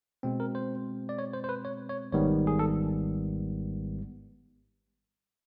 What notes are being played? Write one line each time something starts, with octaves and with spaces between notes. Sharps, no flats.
B2 G#3 C4
A#4
C5
D5
C#5
C5
C5
B4
C#5
C#5
G#1 G#2 D#3 G3 B3 C#5
G#4
A4